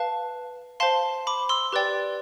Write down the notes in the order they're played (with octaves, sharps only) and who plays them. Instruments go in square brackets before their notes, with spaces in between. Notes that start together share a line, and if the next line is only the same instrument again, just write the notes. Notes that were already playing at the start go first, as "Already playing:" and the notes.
Already playing: [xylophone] B4 F5 A5
C5 F5 A5 C6
B5 D6
C6 E6
G4 B4 D5 G5